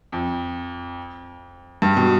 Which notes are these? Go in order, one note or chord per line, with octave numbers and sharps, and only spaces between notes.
F2
G2
B2